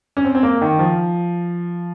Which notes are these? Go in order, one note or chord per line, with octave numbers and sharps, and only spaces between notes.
C#4
C4
C4
A#3
D#3
F3